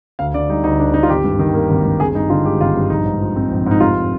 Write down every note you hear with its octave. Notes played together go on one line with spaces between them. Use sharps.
D2 F5
D3 D5
G3 D#4
D2 D#4
D2 D4
D3 D#4
F4
G#1 G4
G2
D#3
A#3
G#1
G2
G#1 G#4
G2 D#4
D3 F4
G#3 G4
G#1 F4
G2
A#1 D#4
G#2
F3
C4
A#1
G#2 D#4
F1 F4